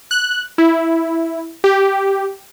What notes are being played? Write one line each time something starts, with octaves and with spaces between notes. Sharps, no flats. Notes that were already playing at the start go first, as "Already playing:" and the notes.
F#6
E4
G4